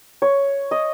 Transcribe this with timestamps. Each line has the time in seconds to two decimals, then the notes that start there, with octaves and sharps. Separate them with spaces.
0.22 C#5
0.71 D#5